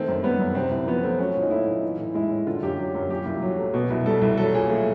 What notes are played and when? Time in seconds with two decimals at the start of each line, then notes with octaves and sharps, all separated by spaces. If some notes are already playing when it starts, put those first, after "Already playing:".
Already playing: D#3 A3 C4
0.08 F#2
0.23 G3 B3
0.40 F#2
0.55 C3 C4
0.71 C2
0.87 F3 B3
1.03 A3 C4
1.19 F#3 C#4
1.36 A#2
1.42 D#4
1.51 A3 E4
1.67 A#2
1.84 E3
1.99 A2
2.14 G#3 E4
2.30 A2
2.46 D3 F4
2.62 F#2 G4
2.78 F#3
2.95 F#2
3.10 A#2 G4
3.26 C2
3.42 F#3
3.59 A3
3.74 B2
3.90 C2
4.06 G3 A4
4.22 C2
4.38 F#3 A4
4.53 A#2 G#4
4.69 A3